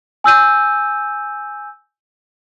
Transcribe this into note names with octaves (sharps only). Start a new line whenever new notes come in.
G#5 E6 G6 D#7